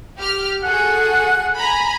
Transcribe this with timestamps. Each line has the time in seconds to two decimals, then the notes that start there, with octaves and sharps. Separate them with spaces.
0.18 G4 F6
0.63 F#4 G#4 A4 F#5
1.58 G#5 A#5 B5